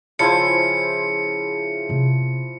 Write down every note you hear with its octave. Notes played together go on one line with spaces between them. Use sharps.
C#3 F3 E4 C5 G#5 C#7
C3 B3